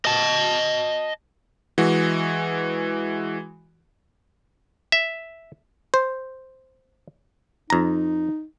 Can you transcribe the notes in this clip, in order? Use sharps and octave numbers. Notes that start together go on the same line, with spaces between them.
D#5 A5
E3 G#3 F#4
E5
C5
F2 D#4 A#5